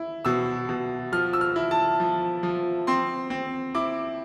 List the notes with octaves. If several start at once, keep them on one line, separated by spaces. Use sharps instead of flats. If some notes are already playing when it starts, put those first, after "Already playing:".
Already playing: E4
B2 E6
B2
F3 F6
E6
F6
E4
A5
F3
F3
C4 C6
C4
E4 D6